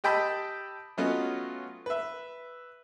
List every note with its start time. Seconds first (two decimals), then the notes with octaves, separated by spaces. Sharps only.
0.04 G4 D#5 G5 A5 B5 E6
0.98 F#3 A3 B3 C#4 F4 D#5
1.86 B4 E5